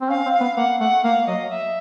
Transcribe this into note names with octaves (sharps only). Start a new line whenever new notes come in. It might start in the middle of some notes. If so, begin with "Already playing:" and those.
C4
C#4 F5
C4
F5
B3
A#3 F#5
A3 F#5
A#3 F5
F#3 D#5
E5